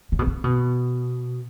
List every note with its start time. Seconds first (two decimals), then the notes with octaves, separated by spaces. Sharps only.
0.12 C#3
0.19 B2
0.27 C#3
0.44 B2